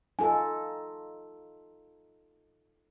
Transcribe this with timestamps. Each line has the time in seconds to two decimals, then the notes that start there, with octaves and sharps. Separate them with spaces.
0.19 D#4 F4 A4 G#5